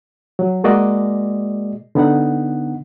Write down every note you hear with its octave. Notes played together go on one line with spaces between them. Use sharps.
F#3
G#3 A#3 F#4 G#4 D5 D#5
D3 B3 D#4 F#5